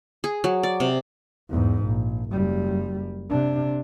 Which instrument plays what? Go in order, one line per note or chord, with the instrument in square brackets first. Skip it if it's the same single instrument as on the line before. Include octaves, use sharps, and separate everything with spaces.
[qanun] G#4
F#3
D5
C3
[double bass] E2 G#2
A#1
F#1 G3
C3 D4